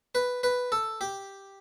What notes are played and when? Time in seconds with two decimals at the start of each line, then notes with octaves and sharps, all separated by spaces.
0.15 B4
0.43 B4
0.72 A4
1.01 G4